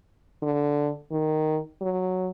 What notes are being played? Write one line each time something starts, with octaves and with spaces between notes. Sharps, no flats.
D3
D#3
F#3